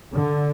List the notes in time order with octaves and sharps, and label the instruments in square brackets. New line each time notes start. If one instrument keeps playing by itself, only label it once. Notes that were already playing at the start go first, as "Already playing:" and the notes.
[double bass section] D3